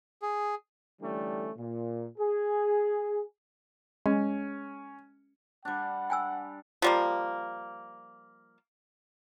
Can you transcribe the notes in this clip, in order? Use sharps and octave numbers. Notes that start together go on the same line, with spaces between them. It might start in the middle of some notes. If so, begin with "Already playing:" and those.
G#4
D3 E3 G3 A3 C#4 D4
A#2
G#4
G#3 C#4
G3 D4 F#5
G5 G#5 E6
F3 G3 A#3